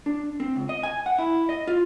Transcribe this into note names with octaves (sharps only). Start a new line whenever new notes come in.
D4
C4
C#2
D#5
G#5
F#5
E4
D#5
F4